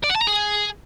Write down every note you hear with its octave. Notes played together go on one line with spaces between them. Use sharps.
D5
F#5
A5
A#5
G#4